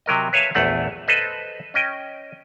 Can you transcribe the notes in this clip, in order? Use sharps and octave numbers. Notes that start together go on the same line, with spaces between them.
C3 F#3 A#4 D#5
B4 C#5 E5 F5 G#5 A5
A#1 E2 A3 F#5
A4 B4 C5 D#5
C#4 D#5 G5